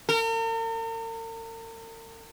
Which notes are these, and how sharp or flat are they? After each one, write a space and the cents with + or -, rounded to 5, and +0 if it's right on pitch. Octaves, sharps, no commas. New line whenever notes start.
A#4 -45